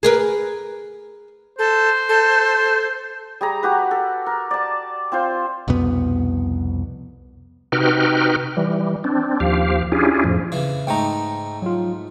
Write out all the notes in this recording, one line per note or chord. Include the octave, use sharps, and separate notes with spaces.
G#4 A#4 B4
A4 C5
A4
G3 G#4 A#5
F#4 G4 B4
A4
A#4
D5 A5
C4 F4 C5
C2 F2 B2 B3
C3 D#4 F#4 B4 G5 F6
E3 G3
C4 D4
D#2 F3 G4 F5
C#4 D4 E4 F4 G4 G#4
F2 A2 F3
C#3 E3
G#2 A3 D#4 G5 A#5
F#3 F4